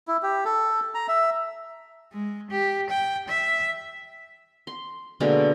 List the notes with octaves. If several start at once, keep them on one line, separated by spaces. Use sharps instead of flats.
E4
G4
A4
A#5
E5
G#3
G4
G5
E5
C6
B2 D3 G#3 A#3